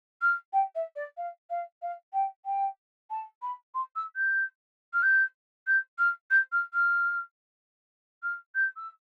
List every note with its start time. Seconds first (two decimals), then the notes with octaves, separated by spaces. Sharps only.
0.21 F6
0.53 G5
0.75 E5
0.96 D5
1.17 F5
1.50 F5
1.82 F5
2.13 G5
2.45 G5
3.10 A5
3.42 B5
3.74 C6
3.96 E6
4.16 G6
4.93 F6
5.03 G6
5.67 G6
5.98 F6
6.31 G6
6.52 F6
6.74 F6
8.23 F6
8.55 G6
8.77 E6